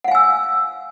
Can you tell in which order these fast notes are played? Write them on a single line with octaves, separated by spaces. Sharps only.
F#5 F5 G#5 E6